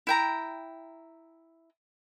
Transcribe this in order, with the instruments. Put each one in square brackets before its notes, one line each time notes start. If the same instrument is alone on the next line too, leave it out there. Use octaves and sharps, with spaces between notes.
[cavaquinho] E4 G5 A#5